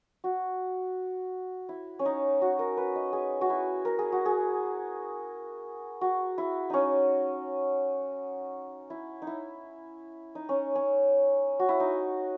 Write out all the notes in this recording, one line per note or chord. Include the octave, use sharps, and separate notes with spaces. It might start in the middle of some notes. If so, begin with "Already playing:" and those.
F#4
E4
C#4
D#4
F#4
A#4
B4
D#5
G#4
F#4
E4
A#4
G#4
F#4
G#4
F#4
E4
C#4 D#4
E4
D#4
E4
D#4
C#4
C#4
F#4
E4
D#4